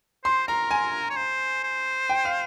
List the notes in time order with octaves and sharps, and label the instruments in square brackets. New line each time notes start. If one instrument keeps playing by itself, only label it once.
[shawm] C5 [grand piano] C6
[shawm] A#4 [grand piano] A#5
[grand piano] G#5
[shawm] C#5
C5
C5
[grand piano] G5
F5